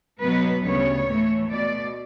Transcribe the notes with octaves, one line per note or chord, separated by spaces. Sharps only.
B2 F#3 B3 B4
D2 C#3 G3 B3 C#5
A2 E3 A3
B2 A3 D5